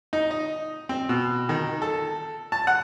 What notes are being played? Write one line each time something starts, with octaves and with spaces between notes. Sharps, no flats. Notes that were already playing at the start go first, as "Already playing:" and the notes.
D#4
D#5
C4
B2
D#3
A4
A5
F#5